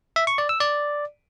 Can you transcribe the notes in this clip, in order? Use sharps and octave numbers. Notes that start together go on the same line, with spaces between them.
E5
C#6
D5
E6
D5